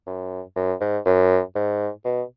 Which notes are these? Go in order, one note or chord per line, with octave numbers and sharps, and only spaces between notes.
F#2
F#2
G#2
F#2
G#2
B2